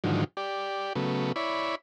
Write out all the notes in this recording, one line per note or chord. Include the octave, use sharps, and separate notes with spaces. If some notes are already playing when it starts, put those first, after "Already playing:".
G#2 D3 D#3 F3 F#3
G4 D5
C#3 F#3 A3 B3
E4 C#5 D5 B5